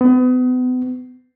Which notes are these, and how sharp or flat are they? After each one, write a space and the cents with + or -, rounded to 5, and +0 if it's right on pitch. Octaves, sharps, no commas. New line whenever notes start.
B3 +35